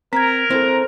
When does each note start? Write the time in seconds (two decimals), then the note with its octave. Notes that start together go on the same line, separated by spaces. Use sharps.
0.13 C4 A#4 A#5 G#6 B6
0.50 C4 E4 A4 C5